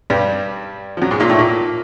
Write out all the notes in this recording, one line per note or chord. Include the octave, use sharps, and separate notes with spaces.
G2 G3
F3
F#2 F#3
G#2 G#3
A#2 A#3
A2 A3
A#2 A#3